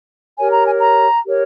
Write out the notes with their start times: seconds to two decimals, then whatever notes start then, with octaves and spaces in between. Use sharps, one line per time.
0.38 G4 A#4 C#5 G#5
0.52 A#5
0.67 G#5
0.81 A#5
1.24 G4 A#4 C#5